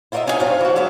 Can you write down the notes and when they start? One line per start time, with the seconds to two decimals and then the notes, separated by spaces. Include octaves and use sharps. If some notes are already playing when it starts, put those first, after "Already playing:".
0.12 E4 F4 A#4 C#5 D#5 E5
0.26 B3 C#4 D#4 E4 D#5 G#5
0.40 G2 C#4 F4 C5 C#5 F5
0.61 E3 F#4
0.76 F#3 G#3 E5 F5